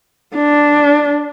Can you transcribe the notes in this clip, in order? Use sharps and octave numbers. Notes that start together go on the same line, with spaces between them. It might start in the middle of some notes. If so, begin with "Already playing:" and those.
D4